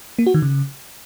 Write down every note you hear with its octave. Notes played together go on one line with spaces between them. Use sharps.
A#3
F#4
D#3
C#3